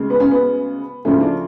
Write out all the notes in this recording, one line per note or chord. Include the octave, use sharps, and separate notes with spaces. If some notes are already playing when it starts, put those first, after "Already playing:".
Already playing: D2 C#3 G#3
B3
C#4
B3
D2 C#3 F3 A3 C#4
D4